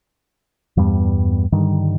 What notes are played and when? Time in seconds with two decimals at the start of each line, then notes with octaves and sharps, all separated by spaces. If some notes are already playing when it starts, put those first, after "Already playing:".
0.77 E2 G2 G3 B3
1.52 G2 D3 D#3 G3